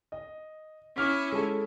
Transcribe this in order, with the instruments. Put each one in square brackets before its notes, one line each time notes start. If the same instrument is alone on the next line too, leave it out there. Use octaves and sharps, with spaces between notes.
[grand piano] D#5
[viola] C#4 E4 [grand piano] D6 F6 B6
[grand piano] G#3 G#4 A4